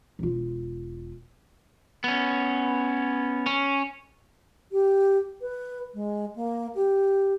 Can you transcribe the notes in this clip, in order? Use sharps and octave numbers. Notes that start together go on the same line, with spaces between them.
E1 F4
B3 C#4
C#4
G4
B4
G#3
A#3
G4